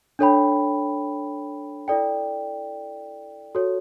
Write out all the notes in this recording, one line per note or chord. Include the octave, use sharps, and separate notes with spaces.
D4 A4 C#5 G5 B5
E4 A4 D5 G5
F#4 A4 C#5